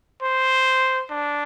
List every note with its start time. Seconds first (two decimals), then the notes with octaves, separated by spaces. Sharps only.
0.22 C5
1.10 D4